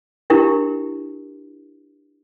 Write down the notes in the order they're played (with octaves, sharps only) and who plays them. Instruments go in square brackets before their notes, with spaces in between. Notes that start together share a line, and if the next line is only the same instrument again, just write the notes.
[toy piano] D4 E4 G4 A#4